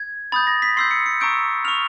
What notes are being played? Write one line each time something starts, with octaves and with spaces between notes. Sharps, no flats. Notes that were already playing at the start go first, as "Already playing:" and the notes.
Already playing: G#6
B5 D#6 G6 A6
A#6
B6
C6 E6 G6 C7
C#7
C#7
A#5 C#6 E6 G6 D7
C#6 F6 F7